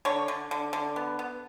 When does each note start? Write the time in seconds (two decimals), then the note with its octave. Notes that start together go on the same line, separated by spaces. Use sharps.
0.05 D3 C#5
0.28 D3
0.51 D3
0.73 D3
0.96 B3
1.19 B3